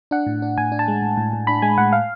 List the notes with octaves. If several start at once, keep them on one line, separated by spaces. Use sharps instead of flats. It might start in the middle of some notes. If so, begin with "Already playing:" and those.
D4 F#5
A2
D4
A2 G#5
D4
A5
G#3
A2
A2
A2
D4 B5
G#3 G#5
A2 F#5
F5